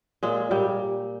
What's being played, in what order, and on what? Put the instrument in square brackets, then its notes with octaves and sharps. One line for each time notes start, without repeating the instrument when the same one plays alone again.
[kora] A#2 G#3
A#2 G3